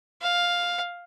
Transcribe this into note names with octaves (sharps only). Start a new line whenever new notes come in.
F5